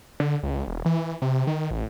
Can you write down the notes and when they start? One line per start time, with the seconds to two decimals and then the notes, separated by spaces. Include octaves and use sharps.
0.20 D3
0.43 C#2
0.68 E1
0.85 E3
1.22 C3
1.47 D#3
1.71 A1